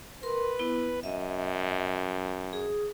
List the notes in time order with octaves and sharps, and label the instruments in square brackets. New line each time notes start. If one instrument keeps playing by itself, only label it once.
[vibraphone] A#4 C6 [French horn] B4
[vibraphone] B3 E4
[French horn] F#2 [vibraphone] D#5 E5
[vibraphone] G#4 D#6